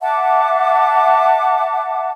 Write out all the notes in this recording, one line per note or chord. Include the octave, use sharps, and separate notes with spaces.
E5 F#5 A5 D6